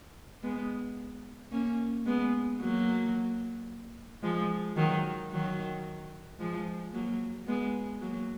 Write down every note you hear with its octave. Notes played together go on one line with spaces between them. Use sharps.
G#3 B3
A#3 C#4
G#3 B3
F#3 A#3
F3 G#3
D#3 F#3
D#3 F#3
F3 G#3
F#3 A#3
G#3 B3
F#3 A#3